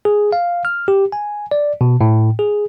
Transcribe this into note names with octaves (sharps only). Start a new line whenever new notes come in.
G#4
F5
F6
G4
G#5
D5
B2
A2
G#4